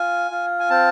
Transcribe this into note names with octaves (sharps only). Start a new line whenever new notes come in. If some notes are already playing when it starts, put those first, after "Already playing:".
Already playing: F4 G#5
F4
G#5
C4 A5